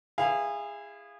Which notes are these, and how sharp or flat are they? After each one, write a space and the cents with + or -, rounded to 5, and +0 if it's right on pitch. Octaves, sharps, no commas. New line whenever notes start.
E4 +15 G#4 -20 F5 +0